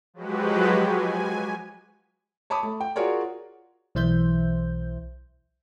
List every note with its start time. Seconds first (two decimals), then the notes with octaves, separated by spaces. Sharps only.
0.14 F3 F#3 G#3 F#4 G4 B4
0.76 G#5
2.50 C#5 A5 B5 D6 D#6
2.63 A3
2.81 G5
2.96 F4 F#4 G#4 A#4 C#5 D5
3.95 B1 E3 C5 E5 G6